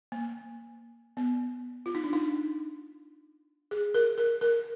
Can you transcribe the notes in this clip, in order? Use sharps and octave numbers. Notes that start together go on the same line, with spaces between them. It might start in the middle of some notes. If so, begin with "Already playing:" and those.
A#3
B3
F4
D#4
D4
D#4
G#4
A#4
A#4
A#4